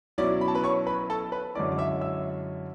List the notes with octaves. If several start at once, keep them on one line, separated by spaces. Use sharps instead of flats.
B2 F#3 C#4 E4 D5 D6
B5
A5
B4 B5
C#5 C#6
B4 B5
A4 A5
B4 B5
F#2 D3 G#3 C#4 E4 D5 D6
D6
E5 E6
E5 E6